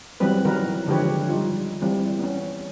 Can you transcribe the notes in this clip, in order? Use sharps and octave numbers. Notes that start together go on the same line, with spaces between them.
E3 F#3 G3 B3 C4 B4
D#3 E3 F#3 A#4 B4
D3 F3 G#3 G4 B4 C#5
G3 D#4 F4
E3 G3 C4
B3 C#4